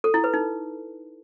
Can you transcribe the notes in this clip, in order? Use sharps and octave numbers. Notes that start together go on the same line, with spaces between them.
A4
E4
B4
D#4